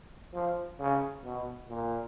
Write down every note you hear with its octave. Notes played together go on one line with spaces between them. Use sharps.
F3
C#3
B2
A#2